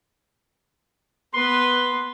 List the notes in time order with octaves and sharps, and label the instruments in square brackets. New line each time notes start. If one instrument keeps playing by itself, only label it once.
[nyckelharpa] B3 B4 [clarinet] C6